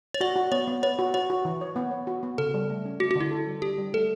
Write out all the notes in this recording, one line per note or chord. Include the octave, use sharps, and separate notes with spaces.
C#5
F#4 D5
F#4
B3 C#5
B3
B4 C#5
F#4
F#4 C#5
F#4
E3
C#5
B3
C#5
F#4
B3
C#3 A4
G3
A3
C#4
A3 F#4
F#4
D3
E4
A4
G3
D4 G4
G3
A3 A4